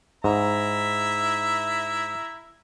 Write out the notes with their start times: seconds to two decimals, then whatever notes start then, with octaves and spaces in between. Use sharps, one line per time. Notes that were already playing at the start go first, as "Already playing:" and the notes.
0.24 G#2 E4 E5 A#5